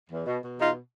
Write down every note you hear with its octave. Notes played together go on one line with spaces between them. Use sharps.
E2
B2
B2
E2 D#4 F4